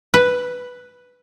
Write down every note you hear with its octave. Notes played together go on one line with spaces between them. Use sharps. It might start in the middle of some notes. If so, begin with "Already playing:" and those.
B4